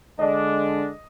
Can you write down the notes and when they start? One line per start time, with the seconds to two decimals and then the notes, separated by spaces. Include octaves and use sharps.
0.19 D3 G#3 D4 D#5